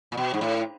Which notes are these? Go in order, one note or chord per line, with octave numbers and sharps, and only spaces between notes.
A#2
B2
G#2
A2